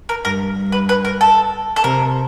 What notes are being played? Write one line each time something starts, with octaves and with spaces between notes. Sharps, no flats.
A#4
G2 A#4
G2
B4
B4
A#4
A4
A4
C3 A#4